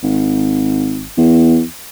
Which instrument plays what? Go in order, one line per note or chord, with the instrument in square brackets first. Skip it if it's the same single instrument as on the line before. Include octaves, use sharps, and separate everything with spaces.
[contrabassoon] G#1
E2